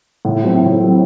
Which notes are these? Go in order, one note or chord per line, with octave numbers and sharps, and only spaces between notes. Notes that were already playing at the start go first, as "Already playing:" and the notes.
A2
F#3 C4
A2
F#3 C4